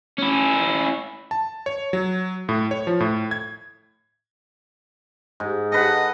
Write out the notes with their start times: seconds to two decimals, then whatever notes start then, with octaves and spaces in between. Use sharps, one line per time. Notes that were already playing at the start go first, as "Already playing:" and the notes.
0.18 C#4 E4
1.31 A5
1.66 C#5
1.93 F#3
2.49 A2
2.71 C#5
2.87 F3
3.00 A2
3.31 G#6
5.40 G#2
5.72 A4 B4 D#5 F#5